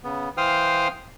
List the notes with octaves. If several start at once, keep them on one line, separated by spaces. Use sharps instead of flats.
C#3 B3
E3 C5 F5 G5 D#6 F6